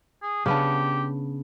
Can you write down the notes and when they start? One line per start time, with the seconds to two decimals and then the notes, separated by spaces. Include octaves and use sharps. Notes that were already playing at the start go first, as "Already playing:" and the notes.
0.23 G#4
0.46 C#3 B3 D4 G4